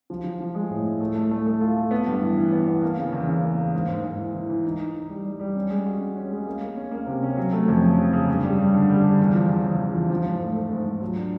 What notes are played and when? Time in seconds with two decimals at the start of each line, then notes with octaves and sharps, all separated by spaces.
0.10 F3
0.24 F3
0.40 F3
0.55 G#3
0.70 A2
0.85 A2
1.00 A3
1.15 A3
1.31 A3
1.47 A3
1.60 F4
1.76 A3
1.91 B3
2.06 G2
2.22 E3
2.37 E3
2.52 B3
2.67 B3
2.82 A#3
2.98 C#3
3.12 E2
3.28 C#3
3.43 A#3
3.58 A#3
3.74 G#2
3.88 G#2
4.04 G#2
4.18 E3
4.35 E3
4.49 E3
4.65 D#4
4.80 D#4
4.95 D#4
5.09 G3
5.25 G3
5.40 G3
5.56 C#4
5.70 G#3
5.86 F#4
6.01 C#4
6.16 C#4
6.31 G#3
6.46 A#3
6.62 A#3
6.77 C#4
6.91 A#3
7.06 C3
7.23 C#4
7.37 F#3
7.53 A3
7.68 F2
7.82 C#3
7.98 C#3
8.13 C#3
8.28 G2
8.43 G3
8.59 G2
8.74 D3
8.89 G3
9.04 G3
9.19 E2
9.35 F3
9.50 E2
9.64 C#3
9.80 E2
9.95 F3
10.10 F3
10.26 G#2
10.41 A3
10.56 A3
10.71 G#2
10.86 G#2
11.01 F#3
11.17 D4